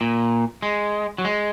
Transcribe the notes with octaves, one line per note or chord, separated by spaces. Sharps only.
A#2
G#3
F#3
G#3